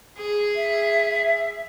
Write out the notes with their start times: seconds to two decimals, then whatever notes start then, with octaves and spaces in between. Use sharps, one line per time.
0.18 G#4
0.55 E5